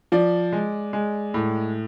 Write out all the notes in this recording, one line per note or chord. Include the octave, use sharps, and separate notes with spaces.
F3 D5
G#3
G#3
A2